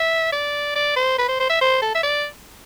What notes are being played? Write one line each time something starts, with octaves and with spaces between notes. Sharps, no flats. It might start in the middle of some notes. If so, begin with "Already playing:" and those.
Already playing: E5
D5
D5
C5
B4
C5
C5
E5
C5
A4
E5
D5